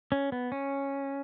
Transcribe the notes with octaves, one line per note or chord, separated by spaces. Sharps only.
C#4
B3
C#4